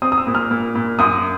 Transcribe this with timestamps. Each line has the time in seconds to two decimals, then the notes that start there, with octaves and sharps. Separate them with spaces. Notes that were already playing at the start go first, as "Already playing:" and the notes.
0.02 C4 D#6
0.12 D#6
0.18 E6
0.27 A#2
0.35 F6
0.51 A#2
0.75 A#2
0.99 F#2 D#6